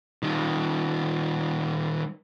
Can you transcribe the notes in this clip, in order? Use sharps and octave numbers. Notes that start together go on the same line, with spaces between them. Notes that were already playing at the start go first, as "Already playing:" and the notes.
D#3 G3